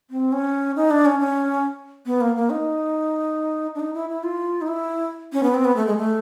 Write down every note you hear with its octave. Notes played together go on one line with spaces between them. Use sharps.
C4
C#4
D#4
D4
C#4
C#4
B3
A#3
A#3
D#4
D4
D#4
E4
E4
F4
D#4
E4
C#4
B3
C4
B3
A3
G#3
A3